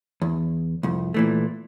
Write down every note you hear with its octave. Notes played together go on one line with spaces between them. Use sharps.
E2
C2 F2
A#2 E3 A3